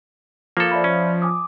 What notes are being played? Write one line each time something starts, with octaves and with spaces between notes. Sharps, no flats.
F3 A#3 A4
D5 E5 B5
C#4
G#5 D6 D#6